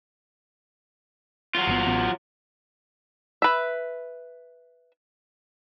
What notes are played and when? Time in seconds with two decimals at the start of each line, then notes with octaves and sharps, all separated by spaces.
1.55 F#3 F4
1.67 G1 C#3 B3
1.87 A1 B3
3.42 B4 E5